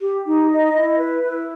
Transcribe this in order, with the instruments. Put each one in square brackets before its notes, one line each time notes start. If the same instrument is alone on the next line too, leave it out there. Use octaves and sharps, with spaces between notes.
[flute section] G4
D#4
D#5
E4
B4
E4